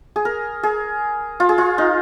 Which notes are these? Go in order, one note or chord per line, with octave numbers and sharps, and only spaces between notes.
G#4
A#4
G#4
F4
G#4
F4
D#4